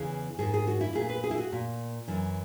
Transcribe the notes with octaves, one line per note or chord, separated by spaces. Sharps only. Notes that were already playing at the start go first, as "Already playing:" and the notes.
Already playing: E2 C#3 E3 G#4
G#2 D#3 G#4
G#4
F#4
E4
A#2 G#4
B4
G#4
E4
F#4
A#2
F#2 E3